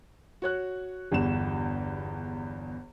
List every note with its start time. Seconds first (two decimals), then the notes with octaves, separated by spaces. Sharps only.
0.42 F#4 C#5 F#6
1.12 G1 E2 E7